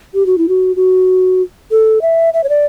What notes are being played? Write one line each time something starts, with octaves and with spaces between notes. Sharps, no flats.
G4
F#4
E4
F#4
F#4
A4
E5
E5
C#5
D5